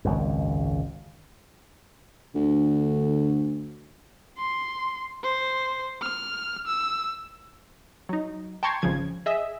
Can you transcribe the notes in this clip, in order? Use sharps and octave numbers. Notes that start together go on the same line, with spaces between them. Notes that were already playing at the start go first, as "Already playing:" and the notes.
G#1 C#2 F#2
D2 D3
C6
C5
F6
E6
F#3 D#4
G5 A5 A#5 C6 C#6 G#6
G#1 C#3 F3 G#6
G#4 D#5 E5